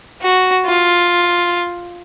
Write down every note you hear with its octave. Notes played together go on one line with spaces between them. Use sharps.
F#4
F4